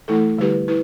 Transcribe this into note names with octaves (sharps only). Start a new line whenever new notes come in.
E3 A3 E4 A4
D3 G3 E4 G4 B4
E4 B4